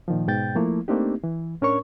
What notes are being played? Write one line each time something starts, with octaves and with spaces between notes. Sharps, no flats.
A#2 D#3 F3
G#2 B2 G5 G6 A6
F3 A3 A#3 E4
A3 A#3 C4 D4 D#4 G4
E3
A2 C#4 D4 A#4 C#5 C#6